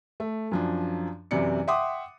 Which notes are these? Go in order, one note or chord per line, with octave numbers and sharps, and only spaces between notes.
A3
F#2 F3 D4
F#2 C3 E3 E4 D5 C#7
E5 F#5 G5 C6 D6 D#6